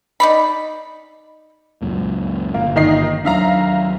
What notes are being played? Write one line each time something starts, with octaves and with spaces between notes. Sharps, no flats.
D#4 D5 B5
C#2 F#2 A#2
G1 A#2 A#3
D#3 D#4 C7
D#2 F#3 D4 E5 F5 A#5